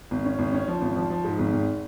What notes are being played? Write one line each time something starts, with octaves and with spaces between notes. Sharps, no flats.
G#1
C#4
G#1
C#4
F3
G#1
F3
F3
G#2
G#1
G#1